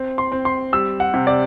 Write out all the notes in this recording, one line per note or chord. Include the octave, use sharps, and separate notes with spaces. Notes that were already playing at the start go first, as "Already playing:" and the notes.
Already playing: C4
C6
C4
C6
G3 E6
F#5
C3
D5